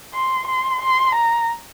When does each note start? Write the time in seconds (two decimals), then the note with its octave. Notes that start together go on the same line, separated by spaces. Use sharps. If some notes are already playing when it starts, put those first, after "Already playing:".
0.14 C6
0.47 C6
0.82 C6
1.15 A#5